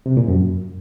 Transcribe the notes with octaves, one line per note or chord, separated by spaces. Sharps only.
C3
A#2
F#2